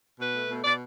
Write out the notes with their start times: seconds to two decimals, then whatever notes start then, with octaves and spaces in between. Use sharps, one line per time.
0.20 B2 B4
0.35 A3
0.50 B2
0.64 B2 D5